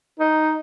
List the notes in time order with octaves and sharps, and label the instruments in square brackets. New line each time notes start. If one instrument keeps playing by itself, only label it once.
[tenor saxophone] D#4